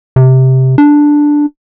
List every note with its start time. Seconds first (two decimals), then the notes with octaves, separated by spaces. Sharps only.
0.16 C3
0.78 D4